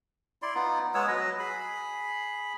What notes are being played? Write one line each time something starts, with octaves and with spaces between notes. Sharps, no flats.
E4 D5 C6
B3 D#4 F4
G#3 B3 C#5 E6
F#3 B4 D#5
G#4 B5